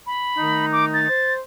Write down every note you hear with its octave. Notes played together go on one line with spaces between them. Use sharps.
B5
D#3 A3 D#4
D6
A6
C5